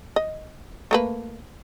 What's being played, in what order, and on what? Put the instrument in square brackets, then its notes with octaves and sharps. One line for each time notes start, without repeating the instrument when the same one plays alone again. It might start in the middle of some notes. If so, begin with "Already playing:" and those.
[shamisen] D#5
A3 A#3 B4